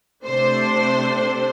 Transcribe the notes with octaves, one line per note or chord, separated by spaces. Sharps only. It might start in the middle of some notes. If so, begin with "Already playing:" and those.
C3 A3 D4 C5